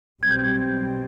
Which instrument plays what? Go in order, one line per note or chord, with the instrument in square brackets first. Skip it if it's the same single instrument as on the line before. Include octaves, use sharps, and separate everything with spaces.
[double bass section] B1 B2 G3 C4 [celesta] G#6
[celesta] G6
G#6